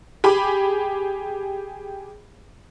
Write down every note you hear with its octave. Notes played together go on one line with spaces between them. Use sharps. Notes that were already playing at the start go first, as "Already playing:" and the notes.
G4 G#4 B5 D6